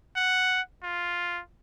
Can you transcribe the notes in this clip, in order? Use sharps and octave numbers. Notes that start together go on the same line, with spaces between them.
F#5
F4